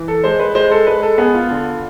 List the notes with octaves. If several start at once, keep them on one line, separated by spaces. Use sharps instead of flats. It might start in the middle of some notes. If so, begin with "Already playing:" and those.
Already playing: E3
A4
G#3 C5
B4
G#3 C5
A4
G#3 B4
A4
B3 G#4
F4
D3